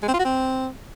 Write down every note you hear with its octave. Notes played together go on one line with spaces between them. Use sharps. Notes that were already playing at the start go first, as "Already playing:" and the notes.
G#3
C4
F4
F#4
C4